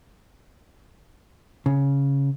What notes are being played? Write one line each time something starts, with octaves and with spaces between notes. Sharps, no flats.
C#3